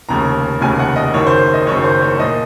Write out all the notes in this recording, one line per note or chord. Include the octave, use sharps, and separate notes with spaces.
F1 D#2 C#3 F3 A#5
F1 D#2 C#3 F3 G#5
F#5
D#5
F#1 F#2 D#3 C#5
C5
D#5
F#1 F#2 D#3 C#5
C5
C#5
A#2 F3 D#5